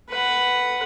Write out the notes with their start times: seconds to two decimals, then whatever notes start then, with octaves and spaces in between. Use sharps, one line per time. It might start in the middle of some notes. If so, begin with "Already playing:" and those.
0.10 B4 F#5